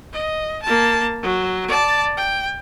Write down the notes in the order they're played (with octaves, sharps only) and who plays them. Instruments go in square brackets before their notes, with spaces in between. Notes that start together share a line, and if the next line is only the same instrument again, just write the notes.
[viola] D#5
A#3 A5
F#3
D5 A5
G5